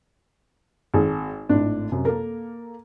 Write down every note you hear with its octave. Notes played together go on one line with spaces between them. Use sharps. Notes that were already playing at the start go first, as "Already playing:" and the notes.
G#1
G#1 A2 D4
F#2 C3
A#3 A4 A#4